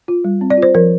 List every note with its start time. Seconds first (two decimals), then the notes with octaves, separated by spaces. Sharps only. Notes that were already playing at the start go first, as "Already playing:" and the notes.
0.08 F4
0.25 G3
0.41 C4
0.50 D5
0.57 F4
0.62 C5
0.75 F3 A#4